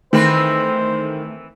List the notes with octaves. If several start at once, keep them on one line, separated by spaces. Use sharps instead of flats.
D#3 E3 A3 C4 B4 C5